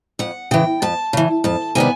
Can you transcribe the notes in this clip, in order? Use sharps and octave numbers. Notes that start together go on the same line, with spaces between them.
F2 F#5
C#3 E3 G5
F2 A5
C#3 E3
F2 A5
C3 D#3 G3 B3 G#5